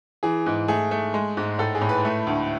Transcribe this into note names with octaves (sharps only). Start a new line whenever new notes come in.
E3 G#4
G#2
A3 G#4
A3
G#3
G#2
A2 A4
G#4
A2
B4
A3
D2